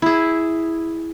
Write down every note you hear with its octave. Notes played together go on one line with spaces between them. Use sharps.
E4 G#4